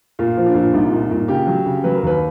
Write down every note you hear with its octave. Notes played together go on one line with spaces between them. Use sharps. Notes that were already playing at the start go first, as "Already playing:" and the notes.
A#2 F4
F3
D4
A#2
C2 D#4
A#2
A#2
C#3 G4
F#3
C#3
F#3 B4
A#4
D#2 B4